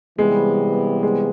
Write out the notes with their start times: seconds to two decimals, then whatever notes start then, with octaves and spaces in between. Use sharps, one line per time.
0.18 C3 E3 G3 G#3 B3
1.03 G#3